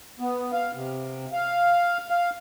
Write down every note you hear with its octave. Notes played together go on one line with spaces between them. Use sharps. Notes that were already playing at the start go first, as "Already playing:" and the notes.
B3
F5
C3
F5
F5